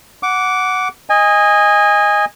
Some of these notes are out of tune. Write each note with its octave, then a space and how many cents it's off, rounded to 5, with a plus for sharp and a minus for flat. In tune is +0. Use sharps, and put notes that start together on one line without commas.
F#5 +0 D6 -15
D#5 +0 G#5 -20